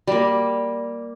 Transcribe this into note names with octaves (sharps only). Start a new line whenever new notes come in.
G3 A#3